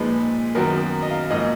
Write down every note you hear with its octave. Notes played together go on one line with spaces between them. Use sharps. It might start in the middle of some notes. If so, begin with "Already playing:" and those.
Already playing: A#2 F3 G#3 D#4 B4
F#2 D#3 F#3 B3 A#4
D#5
F5
G#2 F3 A#3 D#5